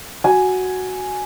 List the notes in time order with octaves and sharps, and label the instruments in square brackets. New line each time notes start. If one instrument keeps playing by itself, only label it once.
[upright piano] F#4 G#5